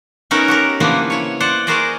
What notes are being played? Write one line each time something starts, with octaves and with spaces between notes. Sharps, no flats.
B3 C#4 D#4 F#4 A#4 E5
F#4 G4 A#4
C#3 E3 F3 A#3 B3 D4
E4 C#5
C5 D5 F#5
F#4 G#4 A#4 C5 D5 D#5